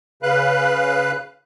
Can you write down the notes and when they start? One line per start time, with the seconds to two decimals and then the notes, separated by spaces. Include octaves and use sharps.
0.23 C#3 B4 F5 F#6